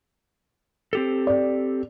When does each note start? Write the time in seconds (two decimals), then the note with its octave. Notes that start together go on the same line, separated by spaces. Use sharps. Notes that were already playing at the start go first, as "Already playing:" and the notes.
0.93 C4 G4 A4
1.27 D5